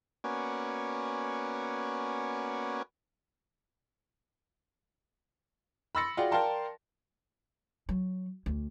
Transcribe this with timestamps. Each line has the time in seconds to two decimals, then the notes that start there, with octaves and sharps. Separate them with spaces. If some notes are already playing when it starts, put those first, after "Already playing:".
0.24 A#3 B3 C#4 F#4 D5 G#5
5.95 B5 C6 E6 A6 A#6 C#7
6.17 F4 F#4 G#4 D5 F#5 G5
6.31 A#4 D5 F5 G5 A5 C6
7.89 F#3
8.46 D2